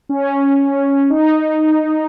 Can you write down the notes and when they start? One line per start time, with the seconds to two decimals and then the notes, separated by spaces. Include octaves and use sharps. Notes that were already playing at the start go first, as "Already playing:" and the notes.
0.09 C#4
1.10 D#4